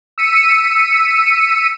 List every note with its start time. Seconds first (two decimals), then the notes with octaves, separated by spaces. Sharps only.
0.18 E6 B6 C#7 D#7